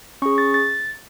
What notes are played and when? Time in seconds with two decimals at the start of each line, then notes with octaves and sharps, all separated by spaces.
0.22 C#4 G#4 C#6
0.38 A6
0.54 A6